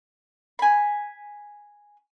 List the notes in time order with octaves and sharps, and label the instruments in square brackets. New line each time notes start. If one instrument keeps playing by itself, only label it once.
[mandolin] G#5 B5